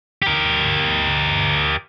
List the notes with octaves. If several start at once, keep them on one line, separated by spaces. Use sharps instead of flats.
G4 A#4